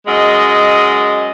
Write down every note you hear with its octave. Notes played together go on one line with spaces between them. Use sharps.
F#2 G#3 D#5